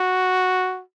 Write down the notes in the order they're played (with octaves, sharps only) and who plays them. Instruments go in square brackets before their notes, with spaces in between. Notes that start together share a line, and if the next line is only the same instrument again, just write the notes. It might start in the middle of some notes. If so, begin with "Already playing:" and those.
Already playing: [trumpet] F#4